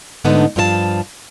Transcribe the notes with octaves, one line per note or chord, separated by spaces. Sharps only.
G#2 D3 A3 B3 D4 D#4
G2 F3 F4 B4 A5